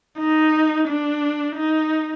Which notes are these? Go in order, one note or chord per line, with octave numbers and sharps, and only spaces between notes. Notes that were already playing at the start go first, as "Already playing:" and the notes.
D#4
D4
D#4